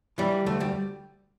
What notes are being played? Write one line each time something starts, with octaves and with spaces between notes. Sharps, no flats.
E3 G3
D2 A3
G3